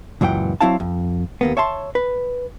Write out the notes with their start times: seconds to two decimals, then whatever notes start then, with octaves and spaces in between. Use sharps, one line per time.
0.21 C#2 F#2 A#2 E3 F#5 G5
0.61 F#3 C4 E4 F5 A5
0.80 F2
1.41 D#2 A#3 B3
1.57 C#5 E5 A5 C6
1.95 B4